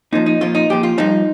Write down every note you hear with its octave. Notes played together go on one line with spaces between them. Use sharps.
A#2 F3 D#4
D#4
A#2 F3 F4
D#4
A#2 F3 G4
F4
G2 F3 D#4